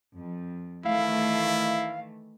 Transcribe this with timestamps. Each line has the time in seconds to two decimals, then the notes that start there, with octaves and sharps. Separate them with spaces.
0.17 F2
0.85 D#3 E3 A3 E4 F5